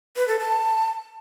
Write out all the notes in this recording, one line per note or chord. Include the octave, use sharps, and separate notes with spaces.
B4
A4
A5